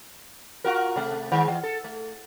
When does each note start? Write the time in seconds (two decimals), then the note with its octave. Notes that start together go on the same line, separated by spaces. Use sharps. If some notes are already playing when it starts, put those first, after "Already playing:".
0.65 F4 F#4 A#4
0.96 C3 A3
1.32 D#3 G#3
1.48 E3
1.63 A4
1.84 A3